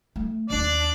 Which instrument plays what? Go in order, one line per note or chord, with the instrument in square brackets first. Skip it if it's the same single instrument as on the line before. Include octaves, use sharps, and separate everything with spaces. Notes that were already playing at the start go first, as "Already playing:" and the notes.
[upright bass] A3
[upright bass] D#2 B3 [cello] D4 [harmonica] D5